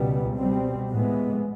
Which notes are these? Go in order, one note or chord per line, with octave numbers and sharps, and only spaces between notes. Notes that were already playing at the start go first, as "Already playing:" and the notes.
Already playing: C#2 B2 G3 B3
B2 G3 C4
A2 E3 G#3 B3